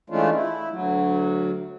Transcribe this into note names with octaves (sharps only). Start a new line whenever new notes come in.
E3 G#3 A3 C#4 D4 F4
E4
D2 F#3